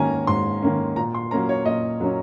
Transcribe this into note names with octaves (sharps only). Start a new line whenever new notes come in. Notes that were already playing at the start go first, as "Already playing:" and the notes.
Already playing: G#2 D#3 A#3 C#4 G#5 A#5
G#2 C6
D#3 A#3 C#4
A#2 A#5
C6
F#3 A#3 C#4 A#5
C#5
A#2 D#5
F#3 A#3 C#4